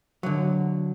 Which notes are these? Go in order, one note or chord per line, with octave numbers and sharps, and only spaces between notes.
D3 F#3